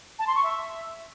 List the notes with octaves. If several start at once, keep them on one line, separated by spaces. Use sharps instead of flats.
A5
C6
C#6
E5